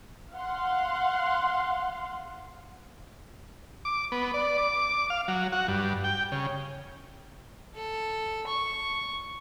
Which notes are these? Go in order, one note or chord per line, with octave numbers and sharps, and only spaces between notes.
F5 F#5 C6
D6
B3
D5
D6
F5
F#3
F#4
G2
G5
C#3
A4
C#6